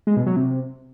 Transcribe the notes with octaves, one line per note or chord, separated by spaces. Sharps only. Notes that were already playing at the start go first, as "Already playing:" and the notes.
G#3
B2
F#3
C3